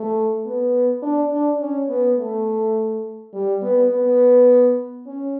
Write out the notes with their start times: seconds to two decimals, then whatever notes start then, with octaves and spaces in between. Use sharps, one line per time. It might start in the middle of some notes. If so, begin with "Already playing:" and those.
Already playing: A3
0.46 B3
1.02 D4
1.32 D4
1.61 C#4
1.89 B3
2.18 A3
3.34 G3
3.62 B3
3.91 B3
5.07 C#4